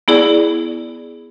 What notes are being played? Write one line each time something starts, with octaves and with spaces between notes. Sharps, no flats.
B3 E4 G#4 D5